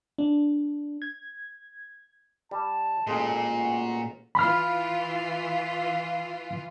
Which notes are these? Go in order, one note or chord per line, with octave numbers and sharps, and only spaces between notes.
D4
G#6
G3 A5
A1 A#2 G#3 A4
F#4
E3 F4 B5 F6